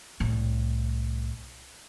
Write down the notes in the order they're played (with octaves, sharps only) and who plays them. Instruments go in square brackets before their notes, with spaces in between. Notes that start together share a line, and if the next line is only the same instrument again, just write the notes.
[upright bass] C2 A2